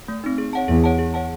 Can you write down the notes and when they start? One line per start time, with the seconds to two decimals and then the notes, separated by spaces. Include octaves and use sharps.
0.08 A3
0.24 C4 D#4
0.38 G#4
0.53 C#5 F#5 A5
0.68 E2 G#4
0.84 C#5 F#5 A5
0.99 G#4
1.14 C#5 F#5 A5